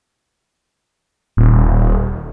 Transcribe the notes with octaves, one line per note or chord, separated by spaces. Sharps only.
D#1